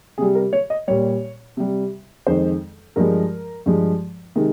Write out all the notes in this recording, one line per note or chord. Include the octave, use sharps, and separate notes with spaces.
C3 G3 G#4
A#4
C#5
D#5
A#2 G3 C#5
C3 G3
F2 D#3 G#3 C5
G2 F3 G#3 A#4
G2 F3 G#3
C3 D#3 G#3